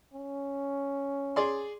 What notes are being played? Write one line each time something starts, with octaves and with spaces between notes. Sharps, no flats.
C#4
G#4 D5 C6